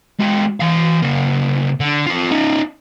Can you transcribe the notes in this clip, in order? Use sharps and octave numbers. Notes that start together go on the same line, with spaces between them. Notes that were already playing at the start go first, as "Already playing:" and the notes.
G#3 F#4
E3 F5
C#3 A#3
D3
F4 A4
C#4 D#4